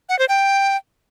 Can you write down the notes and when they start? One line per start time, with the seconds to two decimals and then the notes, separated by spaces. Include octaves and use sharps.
0.09 F#5
0.19 C5
0.29 G5